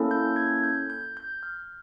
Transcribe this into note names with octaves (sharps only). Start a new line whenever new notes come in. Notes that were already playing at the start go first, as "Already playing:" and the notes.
Already playing: A#3 C#4 E4 A4
G6
G#6
G6
G6
G6
F6